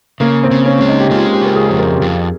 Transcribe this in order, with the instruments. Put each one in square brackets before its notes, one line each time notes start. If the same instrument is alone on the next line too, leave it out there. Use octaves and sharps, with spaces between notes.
[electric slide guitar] C#3 [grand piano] A#3
[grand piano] C4
[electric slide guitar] C#3
[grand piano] C#4
[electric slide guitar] G#3 [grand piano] C#4
[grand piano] D#4
G4
[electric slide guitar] G#3 [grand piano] F4
[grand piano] F4
G4
[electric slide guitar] C#3 [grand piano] A#4
[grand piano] G#4
[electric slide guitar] F2 [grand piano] G#4
[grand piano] A#4
G4
[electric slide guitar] F2 [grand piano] G#4